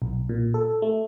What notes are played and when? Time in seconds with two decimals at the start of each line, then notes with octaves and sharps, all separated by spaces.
0.02 B1
0.29 A#2
0.54 A4
0.82 A3